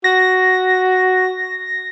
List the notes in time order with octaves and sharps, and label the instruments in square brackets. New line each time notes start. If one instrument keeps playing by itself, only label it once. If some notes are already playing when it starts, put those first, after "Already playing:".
[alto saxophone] F#4 [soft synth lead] A#6